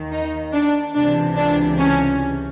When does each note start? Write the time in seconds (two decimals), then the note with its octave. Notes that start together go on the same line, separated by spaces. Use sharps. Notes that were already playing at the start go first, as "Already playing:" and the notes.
Already playing: D#2 D#3
0.12 D#4
0.54 D4
0.95 C#2 C3 E3 D4
1.38 D4
1.80 C#4